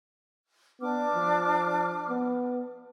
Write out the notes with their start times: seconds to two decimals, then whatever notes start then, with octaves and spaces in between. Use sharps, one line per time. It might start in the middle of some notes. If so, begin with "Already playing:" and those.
0.80 B3 D4 D6 F6
1.14 F3
2.09 B3